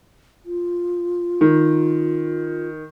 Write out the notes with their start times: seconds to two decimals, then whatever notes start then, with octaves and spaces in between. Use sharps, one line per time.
0.45 F4
1.41 D#3